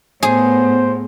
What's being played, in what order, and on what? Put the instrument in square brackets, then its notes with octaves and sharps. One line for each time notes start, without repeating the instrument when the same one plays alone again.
[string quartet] A2 [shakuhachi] B3 [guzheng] G#4 [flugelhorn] C5